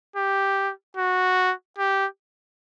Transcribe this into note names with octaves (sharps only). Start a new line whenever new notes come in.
G4
F#4
G4